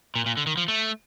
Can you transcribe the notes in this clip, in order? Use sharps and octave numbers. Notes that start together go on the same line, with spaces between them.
A#2
A#2
D3
D#3
F3
A3